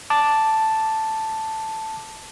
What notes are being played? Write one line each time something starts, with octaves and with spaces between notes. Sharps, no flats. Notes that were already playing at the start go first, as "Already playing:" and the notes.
A5 D6